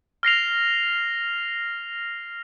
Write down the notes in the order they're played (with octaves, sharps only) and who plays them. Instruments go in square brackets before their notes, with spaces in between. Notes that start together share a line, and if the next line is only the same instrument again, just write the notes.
[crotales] F6 A#6 C7 F7